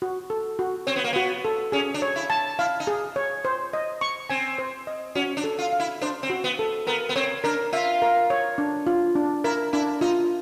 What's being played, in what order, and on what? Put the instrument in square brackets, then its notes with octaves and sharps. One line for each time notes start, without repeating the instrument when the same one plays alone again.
[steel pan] F#4
A4
F#4
[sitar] C4 [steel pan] C#5
[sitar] B3
A#3
[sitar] B3 [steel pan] F#4
[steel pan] A4
[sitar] C#4 [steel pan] G#4
[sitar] D4
[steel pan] C#5
[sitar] E4
[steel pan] A5
[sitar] E4 [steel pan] F5
[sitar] D#4
[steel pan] G#4
C#5
C5
D#5
C#6
[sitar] C4 [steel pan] G#5
[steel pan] C5
D#5
[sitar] C#4 [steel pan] F#4
[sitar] D4
[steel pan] A4
[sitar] F4
[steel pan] F5
[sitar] E4
[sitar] D4 [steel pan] C5
[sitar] C4
[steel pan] F#4
[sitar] B3
[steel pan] A4
[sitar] B3 [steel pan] A#4
[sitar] B3
[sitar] C4 [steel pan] C#5
[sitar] D4 [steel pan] A#4
[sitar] F4 [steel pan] E5
[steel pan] A#4
C#5
D4
F4
D4
[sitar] E4 [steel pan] A#4
[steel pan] D4 [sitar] E4
[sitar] D#4 [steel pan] F4